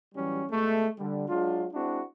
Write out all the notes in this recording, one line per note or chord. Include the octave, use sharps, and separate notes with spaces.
A1 E3 F#3 G3 C#4
B2 G#3 A3
D3 G3
F#3 G#3 D4 F4
G#3 C4 D4 E4 F#4